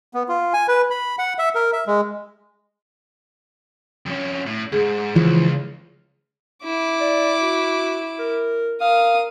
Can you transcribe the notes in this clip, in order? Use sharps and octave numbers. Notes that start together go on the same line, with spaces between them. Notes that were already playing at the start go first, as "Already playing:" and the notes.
B3
F4
G#5
B4
B5
F#5
E5
A#4
E5
G#3
F2 C#4
A2
E2 G#2 G#4
C#2 E3 F3
E4 D6
D5
F#4
A#4
A#4 F5 D#6